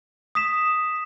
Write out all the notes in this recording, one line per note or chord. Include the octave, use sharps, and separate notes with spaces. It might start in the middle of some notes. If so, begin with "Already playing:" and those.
D#6 B6 E7